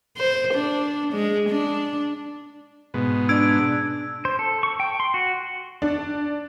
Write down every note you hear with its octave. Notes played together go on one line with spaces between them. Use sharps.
C5
D4
G#3
D4
G#2 B2
D4 E6 G#6 D7
C5
A4
C#6
G5
C6
F#4
D4